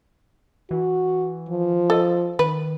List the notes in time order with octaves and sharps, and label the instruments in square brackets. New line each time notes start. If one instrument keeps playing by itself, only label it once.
[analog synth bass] E3 [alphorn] F#4
[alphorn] F3
[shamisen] A4 D#5
[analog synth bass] D#3 [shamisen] B4